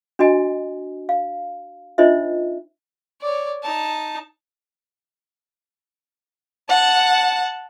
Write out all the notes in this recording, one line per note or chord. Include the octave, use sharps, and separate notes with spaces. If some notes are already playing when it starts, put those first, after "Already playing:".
D4 F#4 D#5 G#5
F5
D4 D#4 F4 C5 D#5 E5
C#5 D5
D#4 A5
F#5 A5